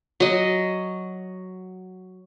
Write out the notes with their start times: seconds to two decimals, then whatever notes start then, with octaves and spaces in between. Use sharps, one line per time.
0.20 F#3 D#5